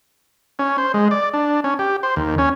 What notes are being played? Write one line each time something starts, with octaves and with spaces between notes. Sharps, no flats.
C#4
C5
G#3
D5
D4
C#4
G4
C5
D#2
C#4